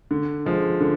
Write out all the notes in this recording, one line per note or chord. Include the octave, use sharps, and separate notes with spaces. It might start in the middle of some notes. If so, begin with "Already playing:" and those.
D3
F3 G#3
D3